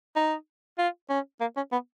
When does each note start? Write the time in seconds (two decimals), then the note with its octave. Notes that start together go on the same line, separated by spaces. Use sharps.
0.16 D#4
0.78 F4
1.10 C#4
1.41 A#3
1.56 C#4
1.72 B3